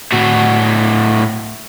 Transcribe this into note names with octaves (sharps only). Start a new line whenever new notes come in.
A2 F#4